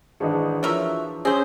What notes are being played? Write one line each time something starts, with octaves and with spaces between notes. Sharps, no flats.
G#1 E3 D4 D#4 G#4
F3 F#3 A#4 E5
C4 C#4 G#4 C5